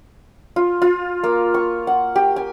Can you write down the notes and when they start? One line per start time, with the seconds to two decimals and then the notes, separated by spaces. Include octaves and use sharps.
0.56 F4
0.82 F4
1.24 A#3
1.54 C#6
1.87 F#5
2.16 G4
2.36 G#5